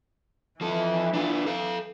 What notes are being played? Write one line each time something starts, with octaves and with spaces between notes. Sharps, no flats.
E3 F3 A4
D4 F4
A4 F5